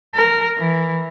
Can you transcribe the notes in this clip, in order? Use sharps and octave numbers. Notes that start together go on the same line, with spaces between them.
A#4
E3